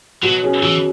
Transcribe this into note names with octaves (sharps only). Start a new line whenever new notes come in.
B2 F#3
F#3 C#4 G#4
B2 E3